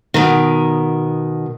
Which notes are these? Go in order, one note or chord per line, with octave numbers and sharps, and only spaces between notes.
B2 D#3